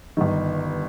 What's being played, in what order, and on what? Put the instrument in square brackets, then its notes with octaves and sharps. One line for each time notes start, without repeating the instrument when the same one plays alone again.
[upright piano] G1 G2 D#3